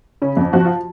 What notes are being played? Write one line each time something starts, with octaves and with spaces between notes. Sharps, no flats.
C#3 C#4
F2
F3 F#4
F4